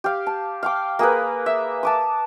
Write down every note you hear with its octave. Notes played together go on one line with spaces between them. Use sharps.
G4 F5
A5
F5 G5 D6
A#3 G#4 A#4 B4
E5
A5 D6 D#6